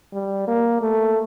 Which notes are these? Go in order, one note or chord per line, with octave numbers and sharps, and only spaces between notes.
G3
A#3
A3